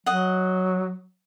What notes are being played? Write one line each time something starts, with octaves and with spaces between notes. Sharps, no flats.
F#3 D#5 F#5